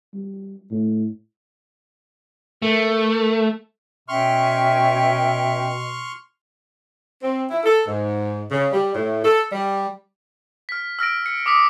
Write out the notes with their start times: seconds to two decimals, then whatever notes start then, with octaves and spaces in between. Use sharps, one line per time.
0.14 G3
0.71 A2
2.62 A3 A#4
4.08 B2 C#4 E5 G5 C6 C#6 F6
7.22 C4
7.50 E4
7.64 A4
7.86 G#2
8.51 C#3
8.72 G3
8.94 A2
9.23 A4
9.52 G3
10.69 F6 B6
10.99 E6 F6 A#6 D7
11.26 C#7
11.46 D6 D#6 B6